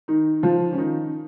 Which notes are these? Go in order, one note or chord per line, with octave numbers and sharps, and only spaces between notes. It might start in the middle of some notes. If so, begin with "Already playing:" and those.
D#3 D#4
F3 F4
C#4
D#3 D#4